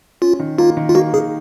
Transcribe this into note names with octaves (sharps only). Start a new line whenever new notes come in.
C#4 F4
D#3
A#3 F4
D#3
F4
A#3 F#4
D#3 G#4